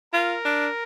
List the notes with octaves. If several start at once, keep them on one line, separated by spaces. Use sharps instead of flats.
F4 A#4
D4